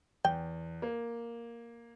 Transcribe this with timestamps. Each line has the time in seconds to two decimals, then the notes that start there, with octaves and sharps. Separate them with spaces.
0.25 E2 G5
0.82 A#3